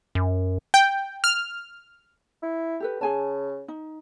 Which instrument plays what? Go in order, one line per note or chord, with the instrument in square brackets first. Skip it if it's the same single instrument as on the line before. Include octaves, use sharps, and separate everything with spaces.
[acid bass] F#2
[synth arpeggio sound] G5
F6
[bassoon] E4
[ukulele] G4 A4 B4
[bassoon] C#3 [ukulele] G#4 G#5 A5
[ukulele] D#4